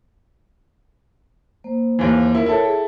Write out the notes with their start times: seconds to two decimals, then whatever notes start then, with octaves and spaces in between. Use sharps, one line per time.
1.64 A#3 C5
1.99 D#2 E3
2.35 E4 A#4
2.46 E4 A4 C#5 G5
2.65 G#4